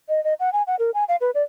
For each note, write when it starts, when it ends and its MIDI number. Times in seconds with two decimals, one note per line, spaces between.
0.09 0.22 75
0.24 0.34 75
0.40 0.52 78
0.53 0.63 80
0.67 0.76 78
0.79 0.91 70
0.94 1.04 80
1.08 1.16 77
1.21 1.31 71
1.35 1.42 74